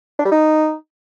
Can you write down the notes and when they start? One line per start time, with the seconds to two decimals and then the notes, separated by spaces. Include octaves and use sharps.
0.19 D4
0.25 G3
0.32 D#4